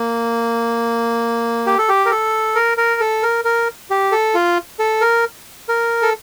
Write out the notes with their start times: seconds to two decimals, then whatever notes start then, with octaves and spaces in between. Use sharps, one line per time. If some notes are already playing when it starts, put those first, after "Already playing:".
Already playing: A#3
1.66 G4
1.78 A4
1.89 G4
2.06 A#4
2.11 A4
2.55 A#4
2.78 A#4
3.01 A4
3.23 A#4
3.45 A#4
3.90 G4
4.12 A4
4.35 F4
4.79 A4
5.01 A#4
5.69 A#4
6.02 A4